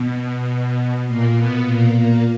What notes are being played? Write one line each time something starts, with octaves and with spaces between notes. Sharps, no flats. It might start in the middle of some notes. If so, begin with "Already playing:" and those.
Already playing: B2
A#2 A#3
B2 B3
A#2 A#3
A#2 A#3